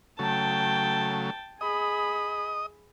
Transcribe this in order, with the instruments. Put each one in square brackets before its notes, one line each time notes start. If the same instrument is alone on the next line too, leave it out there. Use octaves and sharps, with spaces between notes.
[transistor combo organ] C#3 F#3 A3 [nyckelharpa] G5 A5
[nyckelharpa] G#4 B5 [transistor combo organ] D#5 D#6